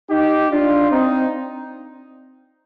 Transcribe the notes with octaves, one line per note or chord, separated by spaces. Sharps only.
D#4 G4
D4 F4
C4 D#4